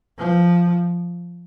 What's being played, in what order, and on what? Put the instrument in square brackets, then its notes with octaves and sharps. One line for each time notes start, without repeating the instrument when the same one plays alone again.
[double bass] F3